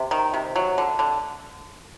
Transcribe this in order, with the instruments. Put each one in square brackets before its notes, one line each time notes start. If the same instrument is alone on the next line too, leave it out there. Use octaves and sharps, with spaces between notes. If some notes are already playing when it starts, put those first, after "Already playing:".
Already playing: [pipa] C3
D#3
C3
F#3
D3
D3